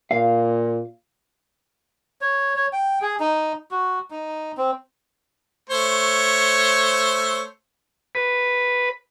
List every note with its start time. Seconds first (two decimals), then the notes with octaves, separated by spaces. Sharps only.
0.11 A#2 F5
2.21 C#5
2.56 C#5
2.73 G5
3.02 G#4
3.20 D#4
3.71 F#4
4.11 D#4
4.57 C4
5.70 A3 C5 C#5
8.15 B4